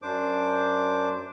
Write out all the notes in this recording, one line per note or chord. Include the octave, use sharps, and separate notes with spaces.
F#2 D4 C5 D6